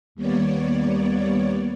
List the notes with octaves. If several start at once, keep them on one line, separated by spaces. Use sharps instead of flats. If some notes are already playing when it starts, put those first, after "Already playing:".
D#2 G3 A#3 B3 C#5 D5